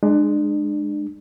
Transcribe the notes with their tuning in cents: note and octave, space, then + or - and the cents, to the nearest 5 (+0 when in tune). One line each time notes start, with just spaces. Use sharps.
G#3 +0 D4 +30